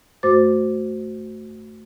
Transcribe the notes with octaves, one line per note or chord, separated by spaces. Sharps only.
F#2 A3 F#4 C5 D6 A6